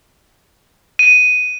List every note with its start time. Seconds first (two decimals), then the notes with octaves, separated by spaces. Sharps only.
0.99 D#7